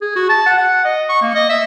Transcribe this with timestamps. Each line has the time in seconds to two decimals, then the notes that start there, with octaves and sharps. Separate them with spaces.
0.02 G#4
0.16 F#4
0.29 A5
0.46 F#5
0.58 F#5
0.85 D#5
1.09 C#6
1.22 A#3
1.35 D#5
1.49 E5